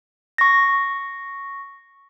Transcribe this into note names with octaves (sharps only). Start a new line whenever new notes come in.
C#6 A#6